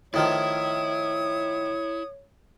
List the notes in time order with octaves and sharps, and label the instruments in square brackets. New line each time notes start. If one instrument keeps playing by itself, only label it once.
[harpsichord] A2 D#3 F3 [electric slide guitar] E4 [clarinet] C#5 [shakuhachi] D#6